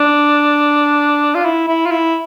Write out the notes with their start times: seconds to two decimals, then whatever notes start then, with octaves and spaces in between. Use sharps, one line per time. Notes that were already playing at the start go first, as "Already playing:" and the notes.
Already playing: D4
1.35 F4
1.45 E4
1.68 E4
1.86 F4
1.91 E4